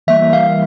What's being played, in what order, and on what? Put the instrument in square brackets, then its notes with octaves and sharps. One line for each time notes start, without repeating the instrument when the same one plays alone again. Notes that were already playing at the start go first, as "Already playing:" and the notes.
[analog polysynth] E3 G3 A#3 [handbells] E5
[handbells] F5